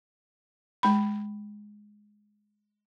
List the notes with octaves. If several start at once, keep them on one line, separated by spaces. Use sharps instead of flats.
G#3 B5